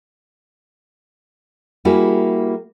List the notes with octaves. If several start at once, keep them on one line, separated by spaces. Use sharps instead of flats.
G3 A#3 E4 F#4 G#4